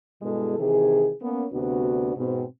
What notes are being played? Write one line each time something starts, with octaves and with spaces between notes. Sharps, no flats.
G2 B2 G#3 E4 G#4 A4
C3 D#3 E3 G#4
A#3 B3 C#4
D2 C3 B3 D4 F#4
G#2 B2 C4